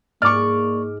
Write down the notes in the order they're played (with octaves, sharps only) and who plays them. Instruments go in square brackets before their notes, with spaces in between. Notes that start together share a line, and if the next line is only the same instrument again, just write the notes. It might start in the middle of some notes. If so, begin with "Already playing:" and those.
[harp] G#2 [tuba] A#3 [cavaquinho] D5 C#6 [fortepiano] D6 F6